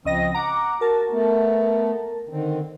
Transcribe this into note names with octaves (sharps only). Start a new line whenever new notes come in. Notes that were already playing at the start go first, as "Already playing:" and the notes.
C#2 F3 C4 D#5 A#6
F#5 A#5 D6
F#4 A#4 A5
A3 B3
D3 D#3 C4